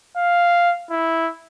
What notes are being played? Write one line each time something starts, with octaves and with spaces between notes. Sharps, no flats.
F5
E4